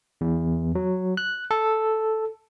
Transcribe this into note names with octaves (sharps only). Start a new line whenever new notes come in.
E2
F#3
F#6
A4